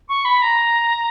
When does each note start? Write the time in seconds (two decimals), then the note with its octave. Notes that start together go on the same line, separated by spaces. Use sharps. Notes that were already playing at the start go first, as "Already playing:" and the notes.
0.08 C#6
0.24 B5
0.41 A#5